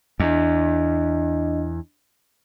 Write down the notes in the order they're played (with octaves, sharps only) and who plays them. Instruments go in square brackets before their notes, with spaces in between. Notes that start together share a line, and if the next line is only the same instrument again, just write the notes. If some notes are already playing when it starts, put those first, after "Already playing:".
[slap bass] E2 [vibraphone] D4 D#5